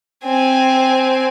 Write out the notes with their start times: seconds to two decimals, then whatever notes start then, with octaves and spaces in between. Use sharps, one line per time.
0.24 C4 G#5